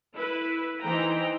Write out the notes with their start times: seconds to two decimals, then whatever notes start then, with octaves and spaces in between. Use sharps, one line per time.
0.14 E4 B4
0.83 E3 D#4 C5 G5 A#5